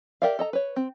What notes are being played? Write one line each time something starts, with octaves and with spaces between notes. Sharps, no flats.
G4 A#4 D5 E5 F5
A4 D#5 A#5
B4 C#5
C4